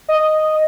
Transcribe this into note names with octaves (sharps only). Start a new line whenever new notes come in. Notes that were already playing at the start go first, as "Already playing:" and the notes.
D#5